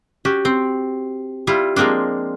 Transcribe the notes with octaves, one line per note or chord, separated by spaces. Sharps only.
C#4 F#4 G4
C4
G3 E4 F4
F3 G#3 A#3 C4 D4